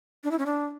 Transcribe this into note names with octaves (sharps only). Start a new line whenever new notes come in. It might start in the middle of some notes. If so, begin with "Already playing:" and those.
D4
E4
C#4
D4